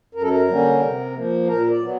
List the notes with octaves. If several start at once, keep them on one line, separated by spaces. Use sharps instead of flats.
F#2 A#4
A4
A#4
D3 G3 A#3 C#4
C3
F3 A#3
A#2 A#4
D5
F#3 B3